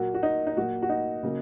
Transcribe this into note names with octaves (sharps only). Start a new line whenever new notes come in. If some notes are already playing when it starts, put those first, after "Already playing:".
Already playing: A#2 F#3 A#3 F#4
F#4
D#4
D#4
A#2 F#3 A#3 F#4
F#4
D#4
C#3 F#3 A#3